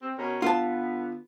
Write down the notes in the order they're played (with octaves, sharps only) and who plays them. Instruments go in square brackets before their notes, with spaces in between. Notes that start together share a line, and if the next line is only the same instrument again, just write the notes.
[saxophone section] C4
B2 C#4 A#4
[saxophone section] D3 B3 [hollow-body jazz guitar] F4 A5